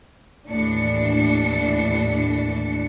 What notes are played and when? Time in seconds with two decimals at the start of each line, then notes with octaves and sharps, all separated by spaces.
0.47 D#2 A2 E3 D4 C#7